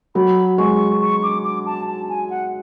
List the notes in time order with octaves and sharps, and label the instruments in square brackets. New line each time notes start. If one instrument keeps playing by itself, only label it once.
[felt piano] F#3 [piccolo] B5
[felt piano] G#3 [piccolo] C#6
[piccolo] C#6
D6
D6
A5
A5
G#5
F#5